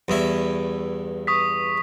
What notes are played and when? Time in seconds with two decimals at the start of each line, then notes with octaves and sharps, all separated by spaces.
0.08 E2 G2 E4
1.27 C#6 D#6 B6